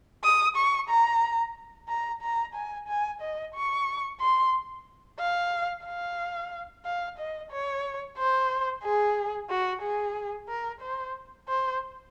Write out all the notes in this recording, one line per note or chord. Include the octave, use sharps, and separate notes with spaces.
D#6
C#6
A#5
A#5
A#5
G#5
G#5
D#5
C#6
C6
F5
F5
F5
D#5
C#5
C5
G#4
F#4
G#4
A#4
C5
C5